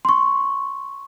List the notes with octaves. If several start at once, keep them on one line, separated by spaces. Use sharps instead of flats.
C6 C#6